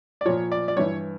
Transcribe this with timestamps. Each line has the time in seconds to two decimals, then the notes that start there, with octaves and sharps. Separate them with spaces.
0.21 D5
0.26 A#2 F3 C#5
0.52 D5
0.68 D5
0.77 G2 E3 C#5